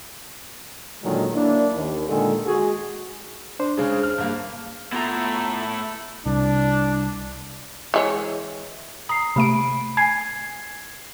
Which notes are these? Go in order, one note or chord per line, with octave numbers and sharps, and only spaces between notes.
A#2 D3 D#3 F#3 G#3
A#3 D4 E4
D#2
A#2 D3 D#3 G#3 G#4 A4
G#3 F#4 G#4
D4 C5
C#3 G#3
F6
G2 A#3
A3 B3 E4 F4 A#5
C2 D4
E3 G#3 C#5
A#5 D#6 C7
C3 A3 B5 D7
G#5 G#6 C7